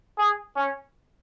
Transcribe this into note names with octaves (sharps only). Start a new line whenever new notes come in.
G#4
C#4